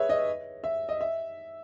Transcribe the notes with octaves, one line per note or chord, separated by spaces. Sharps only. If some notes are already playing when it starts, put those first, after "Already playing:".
Already playing: G#4 B4 C#5 E5
D#5
E5
D#5
E5